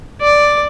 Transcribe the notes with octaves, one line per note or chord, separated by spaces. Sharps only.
D5